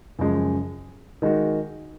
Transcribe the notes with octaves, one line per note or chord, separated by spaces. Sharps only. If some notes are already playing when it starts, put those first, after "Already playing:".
F#2 C#3 F3 G#3
D#3 G#3 D#4 F#4